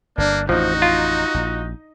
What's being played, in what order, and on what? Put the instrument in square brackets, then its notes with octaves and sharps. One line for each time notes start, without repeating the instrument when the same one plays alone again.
[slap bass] G1 [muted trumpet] A#3 [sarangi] D4
[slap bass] A1 F2 [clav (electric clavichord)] F3 [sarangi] D#4 [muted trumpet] F#4
[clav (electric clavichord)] F4
[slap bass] A#1